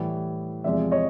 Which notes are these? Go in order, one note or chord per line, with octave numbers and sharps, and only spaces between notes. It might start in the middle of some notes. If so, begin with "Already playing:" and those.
Already playing: A2 E3 G3
E2 C3 F3 G#3 D5 E5
C#5 D#5